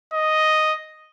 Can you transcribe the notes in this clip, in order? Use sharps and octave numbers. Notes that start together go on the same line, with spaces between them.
D#5